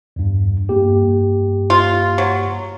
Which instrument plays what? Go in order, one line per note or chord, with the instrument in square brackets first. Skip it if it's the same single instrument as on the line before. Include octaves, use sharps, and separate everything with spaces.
[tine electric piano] E2 G2
G2 A#3 G4
[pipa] F4
F#3